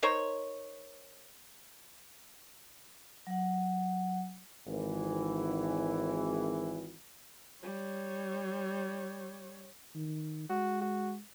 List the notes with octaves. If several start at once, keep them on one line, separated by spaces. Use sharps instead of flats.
D#4 A#4 C5 C#5
F#3 F#5
G#1 E3
G3 C#5
D#3
G#3 F#4
F#4